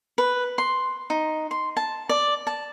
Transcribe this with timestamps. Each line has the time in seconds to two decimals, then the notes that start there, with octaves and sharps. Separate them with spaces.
0.18 B4
0.58 C6
1.10 D#4
1.51 C6
1.77 A5
2.09 D5
2.47 A5